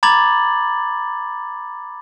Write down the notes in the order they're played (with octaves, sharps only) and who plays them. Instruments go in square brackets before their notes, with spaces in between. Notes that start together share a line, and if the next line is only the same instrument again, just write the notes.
[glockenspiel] A#5 B5 D6 G#6 A6 F#7